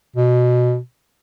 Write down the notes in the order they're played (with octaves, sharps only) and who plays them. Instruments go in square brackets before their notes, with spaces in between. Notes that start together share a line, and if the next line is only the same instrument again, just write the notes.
[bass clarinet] B2